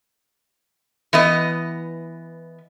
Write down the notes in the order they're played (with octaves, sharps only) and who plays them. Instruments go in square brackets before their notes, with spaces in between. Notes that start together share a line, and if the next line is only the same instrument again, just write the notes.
[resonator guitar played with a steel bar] E3 B3 D#5